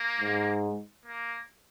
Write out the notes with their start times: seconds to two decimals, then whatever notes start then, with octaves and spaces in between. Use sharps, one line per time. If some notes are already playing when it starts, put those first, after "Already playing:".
Already playing: A#3
0.20 G#2
1.06 A#3